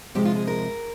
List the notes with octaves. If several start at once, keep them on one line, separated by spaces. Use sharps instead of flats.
C3 F3 G#3 G4
F4
G#4
A#4